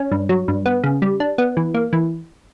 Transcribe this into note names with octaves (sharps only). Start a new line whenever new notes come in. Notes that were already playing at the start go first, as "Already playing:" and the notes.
Already playing: C#4
G2
F#3
G2
B3
C#3
G3
D4
B3
E3
A#3
E3